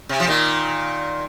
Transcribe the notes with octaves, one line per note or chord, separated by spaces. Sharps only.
C3
F3
A#2 D#3